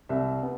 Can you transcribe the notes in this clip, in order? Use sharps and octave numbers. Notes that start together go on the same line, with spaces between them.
C2 E5
B3